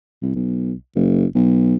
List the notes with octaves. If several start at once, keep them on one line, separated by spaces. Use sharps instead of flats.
C2
B1
F#1
B1